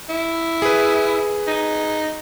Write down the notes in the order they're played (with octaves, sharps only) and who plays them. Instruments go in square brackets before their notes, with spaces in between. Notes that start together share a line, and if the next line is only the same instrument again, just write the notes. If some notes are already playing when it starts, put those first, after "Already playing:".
[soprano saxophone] E4
[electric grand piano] G#4 B4
[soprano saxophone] D#4